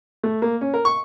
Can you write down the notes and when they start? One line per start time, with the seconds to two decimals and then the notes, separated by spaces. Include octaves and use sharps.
0.23 A3
0.42 A#3
0.61 C#4
0.74 A#4
0.85 C#6